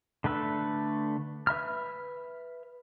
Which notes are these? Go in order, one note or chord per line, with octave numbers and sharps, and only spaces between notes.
D3 A3 B4 E6
B4 E5 B5 F6